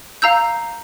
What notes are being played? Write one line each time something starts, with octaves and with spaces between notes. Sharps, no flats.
F5 A#5 E6 G6